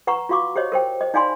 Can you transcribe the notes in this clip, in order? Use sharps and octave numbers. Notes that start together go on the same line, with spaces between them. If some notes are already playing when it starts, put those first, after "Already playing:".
B4 F#5 A#5 C#6
F4 F#4 F5 C#6 D6
G4 C5 C#5 D#5
A#4 C5 G5
C5 D#5
D#4 D5 F5 G#5 B5 C6